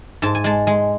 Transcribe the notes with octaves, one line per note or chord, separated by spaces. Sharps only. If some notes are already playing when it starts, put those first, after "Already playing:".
G#2 A5
G#5
G#3 A5
G#3